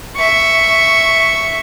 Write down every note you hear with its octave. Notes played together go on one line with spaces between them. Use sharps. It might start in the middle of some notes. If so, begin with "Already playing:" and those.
E5 C#6